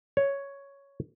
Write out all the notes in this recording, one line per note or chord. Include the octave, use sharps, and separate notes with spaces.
C#5